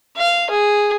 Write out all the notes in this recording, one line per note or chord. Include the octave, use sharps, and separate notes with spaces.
F5
G#4